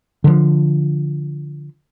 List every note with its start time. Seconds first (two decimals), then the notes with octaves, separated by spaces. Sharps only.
0.24 D3 F3